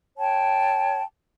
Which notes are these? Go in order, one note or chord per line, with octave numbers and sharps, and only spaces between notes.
C#5 G5 A5